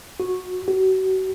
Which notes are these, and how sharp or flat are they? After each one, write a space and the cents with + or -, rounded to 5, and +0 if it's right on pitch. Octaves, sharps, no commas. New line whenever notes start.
F#4 -15
F#4 +35